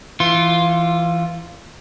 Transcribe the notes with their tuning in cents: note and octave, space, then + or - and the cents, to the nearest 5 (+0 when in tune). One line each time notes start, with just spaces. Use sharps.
E3 +20 F4 +0 C6 +15